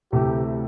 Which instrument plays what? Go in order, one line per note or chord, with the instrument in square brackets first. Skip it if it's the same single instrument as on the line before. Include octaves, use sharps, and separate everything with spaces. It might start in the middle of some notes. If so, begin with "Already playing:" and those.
[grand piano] D2 C3 E3 A3 [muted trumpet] G4